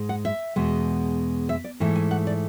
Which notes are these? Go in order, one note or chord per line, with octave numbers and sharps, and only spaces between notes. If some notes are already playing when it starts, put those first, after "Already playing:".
Already playing: G#2 G#3
F#5
E5
E2 B2 G#3
E5
D5
G#2 E3 A3
G#5
F#5
D5